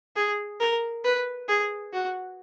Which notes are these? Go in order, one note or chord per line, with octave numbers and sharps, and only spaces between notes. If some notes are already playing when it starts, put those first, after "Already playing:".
G#4
A#4
B4
G#4
F#4